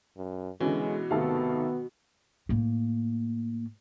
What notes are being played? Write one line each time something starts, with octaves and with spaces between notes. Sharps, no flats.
F#2
B2 D3 E3 G#3 C#4
G#1 C3 D#3 A3 B3 A4 F5
A2 A#3